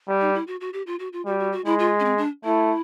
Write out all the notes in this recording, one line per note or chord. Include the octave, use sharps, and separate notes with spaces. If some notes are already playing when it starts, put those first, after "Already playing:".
G3
D#4
E4
F#4
F#4
G4
F4
F#4
F4
G3 F#4
F#4
F#4
G#3 E4
F4
C#4
C4
D4
A3 E4